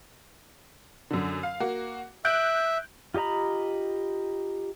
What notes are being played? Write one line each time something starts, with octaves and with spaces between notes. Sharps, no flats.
F#2 D3
F5
A#3 F#4
E5 F#6 G6 D7
F4 G4 D#5 A#5 B5